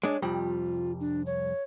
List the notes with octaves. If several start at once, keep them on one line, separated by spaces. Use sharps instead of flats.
G#3 D4 C#5
C2 F2 G3 F4
D4
C#5